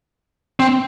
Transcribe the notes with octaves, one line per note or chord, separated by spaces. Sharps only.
C4